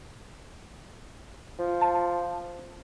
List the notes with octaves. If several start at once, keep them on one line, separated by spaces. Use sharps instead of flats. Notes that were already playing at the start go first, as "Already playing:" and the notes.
F3
A5